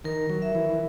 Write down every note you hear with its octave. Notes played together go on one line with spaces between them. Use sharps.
D#3 A#4
F#3
E5
E3
E3